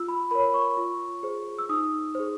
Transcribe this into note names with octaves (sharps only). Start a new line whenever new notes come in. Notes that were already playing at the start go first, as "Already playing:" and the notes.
Already playing: F4 E6
B5
A#4 C#5 B5
C#6
F4
G#4 C5
E6
D#4 D#6
G#4 C5